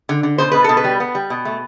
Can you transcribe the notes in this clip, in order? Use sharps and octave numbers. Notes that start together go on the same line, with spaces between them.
D3
D3
B2 C5
B2 B4
B2 A4
B4
G3
B3
G3
B2
A3